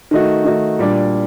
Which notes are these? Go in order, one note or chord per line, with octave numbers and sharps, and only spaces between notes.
D#3 A3 D#4 F#4
D#3 A3 D#4 F#4
A#2 G3 D4